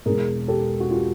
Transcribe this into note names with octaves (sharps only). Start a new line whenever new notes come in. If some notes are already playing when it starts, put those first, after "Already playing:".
E1 E2 B2 G#4 A#4
G4 A4
F#4
F4 G4